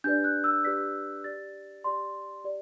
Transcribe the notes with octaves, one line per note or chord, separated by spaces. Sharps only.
D4 G4 B4 D5 G6
F#6
E6
D4 G4 B4 D5 B6
G4 D5 A6
G4 D5 C6
G4 D5